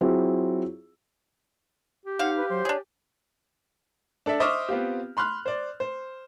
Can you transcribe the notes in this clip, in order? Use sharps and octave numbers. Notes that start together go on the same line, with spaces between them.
F#3 C4 E4 F4 G#4
G4
C4 D#4 F5 F#5
B4
F#3 C5
D4 G#4 C#5
D4 A4 D5 E5
C5 D#5 E5 C#6 D6 F6
B3 C4 F4 G4
B5 C6 F6 F#6
C5 D5
C5